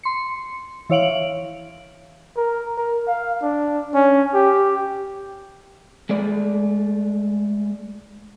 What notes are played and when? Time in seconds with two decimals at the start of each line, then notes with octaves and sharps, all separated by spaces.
0.03 C6 C#7
0.90 E3 E4 C#5 F5 D7 F#7
2.37 A#4
2.77 A#4
3.08 F5
3.42 D4
3.95 C#4
4.34 G4
6.09 G#3 A3 D5